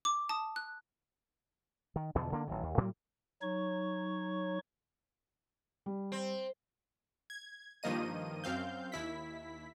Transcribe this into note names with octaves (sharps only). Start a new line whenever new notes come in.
D6
A5 D#6
F#6
D#3
E2 B2 D3 F3
D3 A#3 D4
A1 D#3 F#3
D#2
A2 F#3 G3 A#3
F#3 D#4 C#5 C#6
G3
C4
G#6
G2 D#3 F3 A#3 D#5 D#7
F#2 C4 F5 G6
D#2 E4 B6